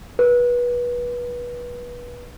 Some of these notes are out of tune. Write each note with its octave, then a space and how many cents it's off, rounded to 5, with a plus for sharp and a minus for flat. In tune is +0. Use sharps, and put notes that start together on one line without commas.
B4 -25